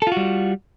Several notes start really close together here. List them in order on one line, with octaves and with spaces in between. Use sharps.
A4 F4 F#4 G3